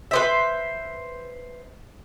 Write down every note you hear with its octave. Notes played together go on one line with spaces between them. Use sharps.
B4 C5 E5